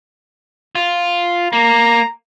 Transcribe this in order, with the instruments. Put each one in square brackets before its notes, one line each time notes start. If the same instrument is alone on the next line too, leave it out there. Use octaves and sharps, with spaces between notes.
[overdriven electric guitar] F4
[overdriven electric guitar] A#3 [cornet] A#5